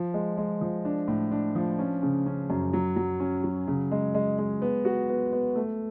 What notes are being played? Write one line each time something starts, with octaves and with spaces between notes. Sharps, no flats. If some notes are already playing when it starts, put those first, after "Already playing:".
Already playing: F3
G#3
G#3
F3
D4
A2
D4
F3
C#4
C#3
C#4
F#2
F#3
F#3
C#4
F#3
C#3
G#3
G#3
G#3
B3
F#4
B3
B3
A3